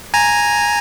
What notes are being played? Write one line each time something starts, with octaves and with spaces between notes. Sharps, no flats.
G#5 A#5